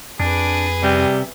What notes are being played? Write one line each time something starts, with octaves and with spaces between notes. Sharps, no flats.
F2 D4 G#4 B4
C3 G3